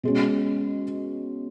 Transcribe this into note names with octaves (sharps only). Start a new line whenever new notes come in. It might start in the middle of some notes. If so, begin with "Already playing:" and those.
B2 G#3 C#4